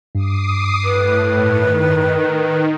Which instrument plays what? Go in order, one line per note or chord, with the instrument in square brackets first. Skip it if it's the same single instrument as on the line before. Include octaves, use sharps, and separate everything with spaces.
[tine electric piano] G2 [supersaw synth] D6 D#6 C7
[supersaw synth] A2 [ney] B4
[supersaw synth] D#3